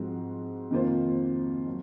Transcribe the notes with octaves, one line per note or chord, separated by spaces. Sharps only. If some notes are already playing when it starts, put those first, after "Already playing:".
Already playing: G#2 F3 C4 F#4 C5
F2 D#3 A#3 F4 C5
F#3